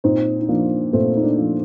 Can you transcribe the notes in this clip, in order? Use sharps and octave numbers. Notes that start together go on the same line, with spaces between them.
A#2 C4 D#4
D#4
F3 A#3 D4
A#2 A3 C4
D#4
A#3 D4
F3